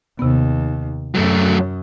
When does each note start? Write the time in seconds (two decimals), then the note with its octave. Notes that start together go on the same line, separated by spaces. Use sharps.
0.19 D#2 C3 B3
1.15 F#2 F#3 A3